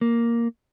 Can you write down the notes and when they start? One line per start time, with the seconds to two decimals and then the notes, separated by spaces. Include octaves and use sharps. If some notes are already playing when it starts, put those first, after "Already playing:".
0.01 A#3